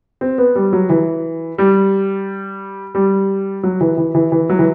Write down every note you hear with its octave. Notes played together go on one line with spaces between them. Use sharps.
C4
B3
G3
F#3
E3
G3
G3
F#3
E3
E3
E3
E3
F#3
E3